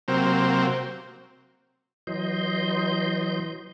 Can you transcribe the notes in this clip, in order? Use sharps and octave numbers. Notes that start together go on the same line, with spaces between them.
C3 F#3 A#3 C4
E3 F#3 D#5 C6 G6